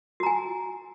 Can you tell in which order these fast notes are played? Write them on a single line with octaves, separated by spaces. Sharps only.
F#4 A#5 G#5